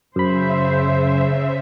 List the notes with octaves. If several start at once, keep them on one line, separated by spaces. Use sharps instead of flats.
F#2 C#3 C5 E5 B5